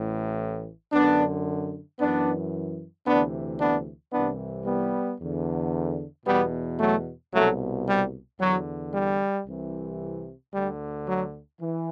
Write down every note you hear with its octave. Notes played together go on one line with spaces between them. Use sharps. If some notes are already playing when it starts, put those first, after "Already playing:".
Already playing: A1 A2 E3
F#2 D3 B3 D4
F#2 E3 B3 D4
D2 C3 E3 B3 D4
B3 D4
C2 C3 E3 B3 D4
G3 B3
E2 D3
E2 B2 G3 B3
F#3 A3
C2 B2 F#3 A3
G3
E2 D3 F#3
G3
C2 C3 E3
D2 D3 G3
F#3
E3